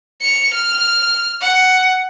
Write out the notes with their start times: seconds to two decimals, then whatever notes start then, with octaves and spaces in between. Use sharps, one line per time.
0.21 C#7 F7
0.54 F6
1.41 F#5